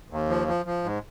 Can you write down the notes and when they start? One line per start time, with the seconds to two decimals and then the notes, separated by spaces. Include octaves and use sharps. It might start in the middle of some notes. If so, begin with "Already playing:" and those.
0.10 D#2
0.29 F3
0.48 F3
0.66 F3
0.84 G#2